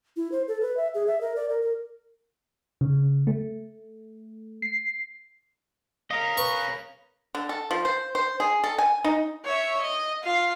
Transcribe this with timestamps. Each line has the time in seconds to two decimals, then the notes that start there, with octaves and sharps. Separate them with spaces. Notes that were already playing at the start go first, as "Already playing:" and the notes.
0.17 E4
0.32 C5
0.48 A4
0.61 B4
0.77 E5
0.95 G#4
1.07 E5
1.21 A#4
1.36 D5
1.49 A#4
1.62 A#4
2.81 C#3
3.27 A3
4.62 C7
6.11 A#4 C#5 D#5 F5
6.37 B4 C#6
7.35 D3
7.49 A4
7.71 F3
7.85 C5
8.15 C5
8.40 G#4
8.64 A4
8.78 G#5
9.04 D#4
9.45 C#5 E5
9.81 D#5
10.23 F4 F5